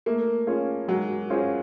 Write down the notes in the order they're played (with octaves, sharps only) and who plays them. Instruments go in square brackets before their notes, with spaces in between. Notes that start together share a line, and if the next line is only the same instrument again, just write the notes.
[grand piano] A3 [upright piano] A#3
[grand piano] C#4 F4 G#4
[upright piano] F#3 [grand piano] G#3
[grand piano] C#4 F4 G#4 C5